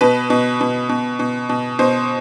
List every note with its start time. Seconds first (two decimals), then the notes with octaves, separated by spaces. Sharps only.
0.01 B2 B4
0.30 B2
0.61 B2
0.89 B2
1.19 B2
1.49 B2
1.79 B2 C5